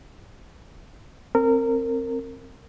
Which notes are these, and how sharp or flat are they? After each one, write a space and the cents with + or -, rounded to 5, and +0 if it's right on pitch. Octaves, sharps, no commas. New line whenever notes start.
C4 +15 A#4 -25